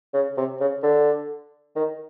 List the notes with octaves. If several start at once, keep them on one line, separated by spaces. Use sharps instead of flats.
C#3
C3
C#3
D3
D#3